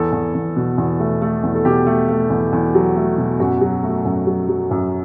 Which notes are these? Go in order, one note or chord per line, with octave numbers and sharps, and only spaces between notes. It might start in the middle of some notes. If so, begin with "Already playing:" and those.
Already playing: E2 A4
E2
E2
B2
E2
A3
A3
E2
A4
B2 G4
A3
A3
E2
E2
F#3
A3
B2
F#2 F#4
F#3
A3
F#2
F#3
F#3
F#2